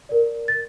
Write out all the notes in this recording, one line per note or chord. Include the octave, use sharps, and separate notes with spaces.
A#4 D5
A6